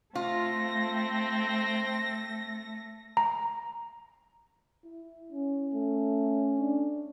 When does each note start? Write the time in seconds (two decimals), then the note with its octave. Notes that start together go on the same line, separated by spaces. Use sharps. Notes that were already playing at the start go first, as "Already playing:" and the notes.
0.15 A3 C4 F4 A#6
3.17 A#5
4.85 E4
5.32 C#4
5.74 A3
6.59 D4